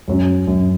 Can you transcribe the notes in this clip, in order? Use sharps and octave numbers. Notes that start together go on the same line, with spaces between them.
F#2 F#3 C#4
F#2 F#3 C#4